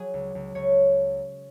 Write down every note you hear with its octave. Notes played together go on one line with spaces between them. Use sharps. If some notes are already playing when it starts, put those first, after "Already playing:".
Already playing: F#3 G#4
C#2
C#2
C#2 C#5